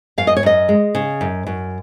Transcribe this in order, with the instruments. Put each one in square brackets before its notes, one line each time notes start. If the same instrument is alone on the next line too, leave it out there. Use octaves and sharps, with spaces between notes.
[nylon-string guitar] F#2 F5
D#5
C#5
F#2 D#5
G#3
C#3
F#2
F#2